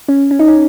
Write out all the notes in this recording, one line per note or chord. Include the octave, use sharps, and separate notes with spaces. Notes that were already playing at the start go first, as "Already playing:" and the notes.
C#4
C#4
D#4
C#4